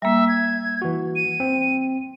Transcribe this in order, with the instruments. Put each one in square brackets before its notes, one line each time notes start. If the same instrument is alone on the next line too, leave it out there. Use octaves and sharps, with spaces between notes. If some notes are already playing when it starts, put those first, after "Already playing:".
[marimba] G3 A#3 [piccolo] E5
[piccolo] G#6
[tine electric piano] E3 F#4
[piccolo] D#7
[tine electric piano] C4